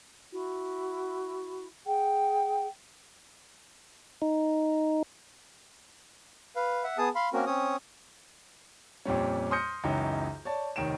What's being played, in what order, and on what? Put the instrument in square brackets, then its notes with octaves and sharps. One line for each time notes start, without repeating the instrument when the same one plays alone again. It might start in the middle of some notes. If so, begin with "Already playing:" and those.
[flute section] E4 F#4
G#4 F#5 G5
[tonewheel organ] D#4
[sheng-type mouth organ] B4 F5
E5 F#5
B3 G#4 A5 D#6
F5 B5 C6
A#3 C4 C#4 F#4 A#4
C4 C#4 C#5 D#6
[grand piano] F2 A#2 G3 C#4
C6 D#6 F6 G6 A#6 C#7
C#2 F#2 E3 D#4 C#5 G5
C#5 D5 A5
F1 D#3 C#5 D7 E7